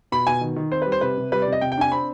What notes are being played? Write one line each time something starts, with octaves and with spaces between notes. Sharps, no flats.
B2 B5
B2 G#5
D#3
D#3
C4 C5
B4
G3
C5
C3 B4
C3
G3 B4
D5
C3
D#5
C3 G5
G5
D4 G#5
C4 B5